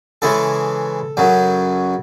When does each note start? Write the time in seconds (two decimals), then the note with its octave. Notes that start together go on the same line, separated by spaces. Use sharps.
0.22 C#3 E3 G#3 A4
1.17 F#2 C#3 F#3